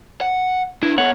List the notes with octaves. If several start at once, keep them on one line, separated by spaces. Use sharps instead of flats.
F#5
D4 E4 B4
B3 A4 C#5 F#5